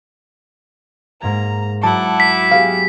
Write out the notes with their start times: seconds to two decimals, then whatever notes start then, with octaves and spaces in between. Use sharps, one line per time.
1.21 G#2 A#3 A#5 G#6
1.83 F#3 E4 F#5 A5 D6
2.20 B6
2.52 B3 G4 G#4 F5